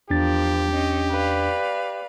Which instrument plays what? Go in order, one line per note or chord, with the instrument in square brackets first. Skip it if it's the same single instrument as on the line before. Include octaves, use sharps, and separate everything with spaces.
[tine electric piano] E2 D4 A6 [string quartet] F3 A#4 [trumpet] G4
[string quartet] C#4 D#5
B4 D5 F5